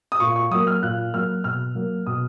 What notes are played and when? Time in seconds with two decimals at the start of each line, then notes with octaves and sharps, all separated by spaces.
0.12 D#6
0.20 A#2 C#6
0.36 C#6
0.51 F#3 A#3 D#6
0.67 F6
0.83 A#2 F#6
1.13 F#3 A#3 F6
1.44 B2 F6
1.75 F#3 A#3
2.06 B2 D#6